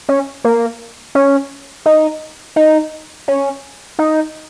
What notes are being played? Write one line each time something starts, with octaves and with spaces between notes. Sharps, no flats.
C#4
A#3
C#4
D#4
D#4
C#4
D#4